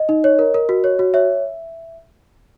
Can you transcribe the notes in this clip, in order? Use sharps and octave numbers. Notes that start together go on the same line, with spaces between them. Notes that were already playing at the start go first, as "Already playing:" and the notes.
Already playing: D#5
D#4
C#5
A#4
A#4
F#4
C#5
F#4
C#5 E5